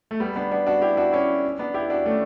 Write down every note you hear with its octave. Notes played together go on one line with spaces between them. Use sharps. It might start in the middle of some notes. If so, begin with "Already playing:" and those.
A3
G3 B3
B3 D4
B3 D4
D4 F#4
E4 G4
D4 F#4
C#4 E4
B3 D4
E4 G4
D4 F#4
A3 C#4